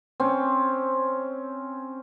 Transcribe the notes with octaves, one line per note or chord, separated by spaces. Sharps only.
C4 C#4